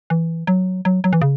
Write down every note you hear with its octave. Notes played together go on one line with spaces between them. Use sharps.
E3
F#3
F#3
F#3
E3
C#3